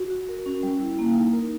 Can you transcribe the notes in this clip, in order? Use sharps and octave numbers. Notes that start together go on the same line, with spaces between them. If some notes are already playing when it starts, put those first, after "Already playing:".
Already playing: F#4
F#4
A#4
C#4
G3
E4
A#3
D#4
A#4